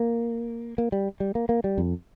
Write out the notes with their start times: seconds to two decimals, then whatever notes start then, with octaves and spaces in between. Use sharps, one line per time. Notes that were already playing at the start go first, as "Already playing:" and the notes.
Already playing: A#3
0.78 A#3
0.92 G3
1.20 G3
1.35 A#3
1.49 A#3
1.64 G3
1.78 F2